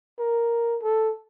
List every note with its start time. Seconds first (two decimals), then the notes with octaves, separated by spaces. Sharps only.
0.19 A#4
0.82 A4